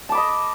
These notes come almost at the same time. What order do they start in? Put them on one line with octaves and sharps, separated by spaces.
A5 D6 B5 D#5